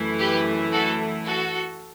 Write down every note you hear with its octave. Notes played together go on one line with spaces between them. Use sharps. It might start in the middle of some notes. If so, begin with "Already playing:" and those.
Already playing: F#2 E3 A3 E4
G4 B4
F#4 A4
F#4 A4